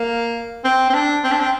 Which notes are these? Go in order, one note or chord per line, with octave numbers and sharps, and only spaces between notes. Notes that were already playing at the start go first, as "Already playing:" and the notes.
Already playing: A#3
C4
C4
D4
C4
D4
C4